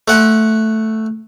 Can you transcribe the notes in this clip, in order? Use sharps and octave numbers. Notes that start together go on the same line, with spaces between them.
A3 F#5